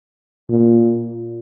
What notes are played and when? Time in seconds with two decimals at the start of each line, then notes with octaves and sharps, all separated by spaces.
0.50 A#2